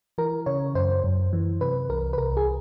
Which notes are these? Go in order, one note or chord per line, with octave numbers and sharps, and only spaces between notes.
E3 A#4
C#3 C#5
F#2 C5
F#2
E3
C3 B4
C2 A#4
B4
C2 A#4
G#4